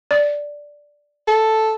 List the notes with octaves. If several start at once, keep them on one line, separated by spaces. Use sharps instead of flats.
D5
A4